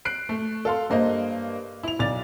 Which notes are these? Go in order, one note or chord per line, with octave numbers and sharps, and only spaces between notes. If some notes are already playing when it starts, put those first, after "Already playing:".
F#6 C7 D7
A3
A4 F5 C6
G2 A#3 C5 D#5
E4 F7
B1 D5 A6 F7